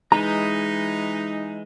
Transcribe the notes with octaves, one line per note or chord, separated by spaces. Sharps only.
E3 G#3 D#4 A#5